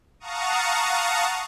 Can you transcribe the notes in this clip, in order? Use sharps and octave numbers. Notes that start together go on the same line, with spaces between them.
F5 F#5 A5 A#5 C#6 D#6